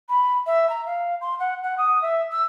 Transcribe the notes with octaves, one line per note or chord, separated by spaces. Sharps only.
B5
E5
A#5
F5
C6
F#5
F#5
D#6
E5
E6